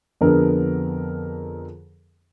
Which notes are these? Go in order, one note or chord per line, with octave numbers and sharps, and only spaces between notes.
F2 D3 B3 G#4 A#4